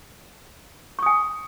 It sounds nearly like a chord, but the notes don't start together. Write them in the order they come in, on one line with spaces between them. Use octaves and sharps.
C#6 D#6 G#5